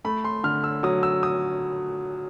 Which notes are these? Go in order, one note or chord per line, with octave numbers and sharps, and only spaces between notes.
A3 B5
C6
D3 F6
E6
F#3 D#6
E6
D#6